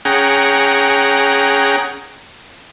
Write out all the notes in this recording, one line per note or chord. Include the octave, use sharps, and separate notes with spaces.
C#4 G#4 F#5 G5 A#5